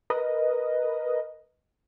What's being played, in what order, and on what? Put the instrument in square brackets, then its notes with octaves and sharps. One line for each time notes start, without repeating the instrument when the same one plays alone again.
[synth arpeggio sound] A#4 B4 D#5